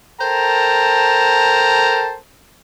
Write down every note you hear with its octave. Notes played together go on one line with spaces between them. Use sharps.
A4 A#4 C5 G5 A5 A#5